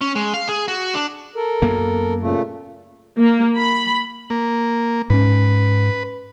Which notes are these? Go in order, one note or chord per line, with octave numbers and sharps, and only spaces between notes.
C#4
G#3
F5
G#4
F#4
D4
A4 A#4
F#2 A#3 B3
A#2 C#3 A3
A#3
B5
A#3
G#2 C#4 B4